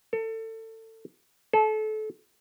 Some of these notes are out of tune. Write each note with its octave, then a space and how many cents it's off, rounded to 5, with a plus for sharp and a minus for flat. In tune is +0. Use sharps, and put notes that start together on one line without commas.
A4 +25
A4 -30